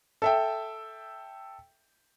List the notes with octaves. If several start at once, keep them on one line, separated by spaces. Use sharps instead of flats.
A4 E5 G5